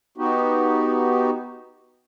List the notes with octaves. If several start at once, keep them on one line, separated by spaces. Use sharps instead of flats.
B3 D#4 F#4 G4